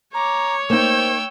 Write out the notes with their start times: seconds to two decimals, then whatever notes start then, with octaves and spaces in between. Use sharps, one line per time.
0.14 C#5 A#5 D6
0.70 A#3 D#4 C5 G5 E6